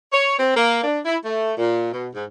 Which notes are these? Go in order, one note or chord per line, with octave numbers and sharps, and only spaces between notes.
C#5
C4
A#3
D4
E4
A3
A#2
B2
G#2